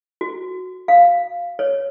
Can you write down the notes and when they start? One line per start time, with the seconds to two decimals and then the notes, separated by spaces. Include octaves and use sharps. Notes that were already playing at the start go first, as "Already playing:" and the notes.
0.21 F#4
0.88 F5
1.59 C#5